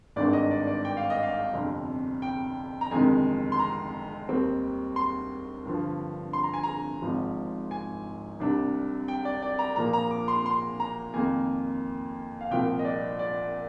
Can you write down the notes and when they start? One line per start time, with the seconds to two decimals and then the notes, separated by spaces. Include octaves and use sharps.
0.16 G#1 G2 D#3 G#3 D4 D5
0.33 D#5
0.51 D5
0.67 D5
0.85 G5
0.97 F5
1.10 D#5
1.23 F5
1.54 G1 F2 C3
2.22 G5
2.81 A#5
2.91 G1 F2 C3 D#3 G#3 G#5
3.52 C6
3.59 A#5
4.28 D#2 D#3 G3 C4
4.96 C6
5.65 G2 D3 F3
6.33 C6
6.43 A#5
6.54 G#5
6.63 A#5
7.02 G#1 G#2 F3
7.71 G#5
8.40 C2 C3 G3 D4
9.08 G5
9.25 D5
9.42 D5
9.59 A#5
9.76 A#2 F3 A#3 A#5
9.93 A#5
10.11 D6
10.28 C6
10.46 C6
10.80 A#5
11.14 F2 D#3 A#3 G#5
12.41 F5
12.51 C2 A#2 F3 G5
12.79 D#5
12.85 D5
13.19 D5